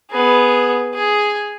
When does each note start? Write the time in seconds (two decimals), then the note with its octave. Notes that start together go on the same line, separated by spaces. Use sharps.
0.11 B3 G#4
0.94 G#4